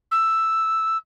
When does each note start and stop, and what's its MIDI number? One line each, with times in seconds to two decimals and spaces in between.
0.11 0.97 88